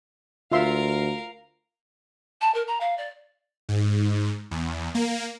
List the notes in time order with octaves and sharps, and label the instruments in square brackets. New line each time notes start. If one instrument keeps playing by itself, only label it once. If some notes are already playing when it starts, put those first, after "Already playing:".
[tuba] D2 [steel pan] F4 E5 C6 [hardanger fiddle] A#4 F5
[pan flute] A5
A#4
A#5
F5
D5
[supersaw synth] G#2
E2
A#3